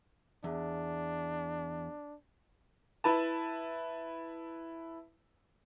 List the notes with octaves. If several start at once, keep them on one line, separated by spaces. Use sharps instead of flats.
E2 D4
E4 B4 A5